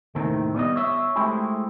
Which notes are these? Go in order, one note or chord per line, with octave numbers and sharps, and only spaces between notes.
D#2 A2 C3 D#3 C4
G3 B3 D5 D#5
C#5 E5
G#3 A3 C4 E4 G4 G#4